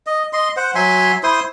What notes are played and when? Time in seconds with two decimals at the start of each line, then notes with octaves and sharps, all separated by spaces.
0.07 D#5
0.33 D#5 C6
0.57 C5 F#5
0.75 F#3 E5 G#5 C6
1.23 E4 C5 C6 D#6